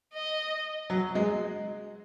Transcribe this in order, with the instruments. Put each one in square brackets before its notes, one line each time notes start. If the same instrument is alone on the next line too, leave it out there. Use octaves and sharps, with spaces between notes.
[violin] D#5
[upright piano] F#3
G#3